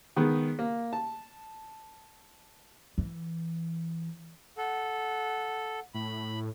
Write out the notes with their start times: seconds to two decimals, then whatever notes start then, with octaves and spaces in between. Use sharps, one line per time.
0.16 D#3 G#3 B3
0.59 A#3
0.93 A5
2.98 E3
4.57 A4 F#5
5.94 A2 B5